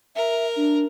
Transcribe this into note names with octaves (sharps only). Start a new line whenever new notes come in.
A#4 E5
D4